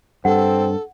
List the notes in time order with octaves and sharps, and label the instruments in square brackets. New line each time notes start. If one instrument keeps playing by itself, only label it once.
[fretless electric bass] G2 [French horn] C4 [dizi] A4 [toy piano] F#5